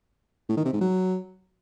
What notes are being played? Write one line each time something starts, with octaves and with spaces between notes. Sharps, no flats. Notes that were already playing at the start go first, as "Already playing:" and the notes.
A2
D#3
C3
G#2
F#3